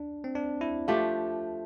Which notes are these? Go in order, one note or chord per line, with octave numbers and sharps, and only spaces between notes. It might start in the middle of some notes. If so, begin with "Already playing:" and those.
Already playing: D4
C4
D4
E4
F3 A3 D4 F4 G4